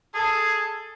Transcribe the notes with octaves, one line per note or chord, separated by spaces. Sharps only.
G#4 A4